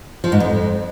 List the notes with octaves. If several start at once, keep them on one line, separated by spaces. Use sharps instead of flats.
F3
G#2
F2